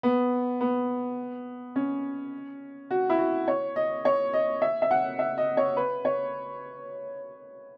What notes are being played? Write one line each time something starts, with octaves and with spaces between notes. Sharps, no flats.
B3
B3
C#4
F#4
E4
F#4
C#5
D#5
C#5
D#5
E5
E5
F#5
E5
D#5
C#5
B4
C#5